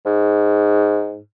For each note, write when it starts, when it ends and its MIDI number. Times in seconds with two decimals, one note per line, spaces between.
0.06 1.19 44